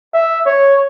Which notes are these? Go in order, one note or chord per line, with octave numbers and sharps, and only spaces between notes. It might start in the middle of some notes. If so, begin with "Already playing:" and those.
E5
C#5